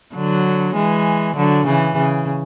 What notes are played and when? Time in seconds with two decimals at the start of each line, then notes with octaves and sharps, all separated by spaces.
0.15 D3 F#3
0.75 E3 G#3
1.36 D3 F#3
1.66 C#3 E3
1.96 C#3